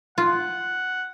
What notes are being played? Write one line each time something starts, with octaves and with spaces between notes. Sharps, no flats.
F4 F#5